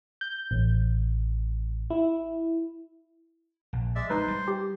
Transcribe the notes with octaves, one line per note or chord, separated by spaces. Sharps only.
G6
A1
E4
A#1
G#3 D5 E5
G#3 D#4 B4 C5 C6
G3
G4